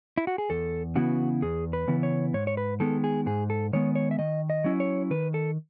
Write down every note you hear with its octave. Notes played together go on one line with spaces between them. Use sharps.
E4
F#4
G#4
E2 A4
C#3 E3 B3 E4 F#4
E2 G#4
B4
C#3 E3 B3 E4
C#5
G#2 C#5
C#5
B4
D#3 G#3 B3 A4
G#4
G#2 G#4
A4
D#3 G#3 B3 C#5
C#5
E5
D#3 D#5
D#5
F#3 C#4 E4
C#5
D#3 B4
A4